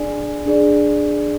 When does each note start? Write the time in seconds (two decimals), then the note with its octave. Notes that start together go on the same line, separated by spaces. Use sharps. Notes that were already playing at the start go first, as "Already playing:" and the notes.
Already playing: D4 G#4 D5 G#5
0.46 D4 G#4 D5